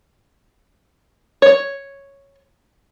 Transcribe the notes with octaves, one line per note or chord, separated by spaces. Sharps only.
C#5